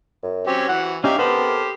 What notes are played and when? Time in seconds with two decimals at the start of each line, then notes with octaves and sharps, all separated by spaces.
0.23 F#2
0.47 F#3 C4 C#4 G4
0.68 E3 F#4 F#5
1.04 C#4 D#4 G4 D5 E5 F5
1.19 B3 G4 A4 A#4 C5 B5